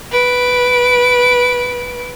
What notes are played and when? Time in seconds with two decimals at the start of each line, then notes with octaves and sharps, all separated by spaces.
0.11 B4 D7